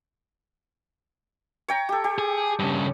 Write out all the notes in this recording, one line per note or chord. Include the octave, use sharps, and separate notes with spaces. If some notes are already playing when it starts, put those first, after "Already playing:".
C#5 G5 A#5
G4 A4
G4
G#4
G2 C#3